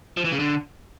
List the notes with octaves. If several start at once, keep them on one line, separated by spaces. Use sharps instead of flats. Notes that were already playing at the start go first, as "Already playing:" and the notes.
F3
E3
C#3
D3